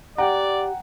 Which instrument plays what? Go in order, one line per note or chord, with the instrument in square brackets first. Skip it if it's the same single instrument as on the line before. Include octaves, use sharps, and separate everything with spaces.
[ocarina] G4 [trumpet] D5 [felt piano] F#5 [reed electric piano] G5 A#5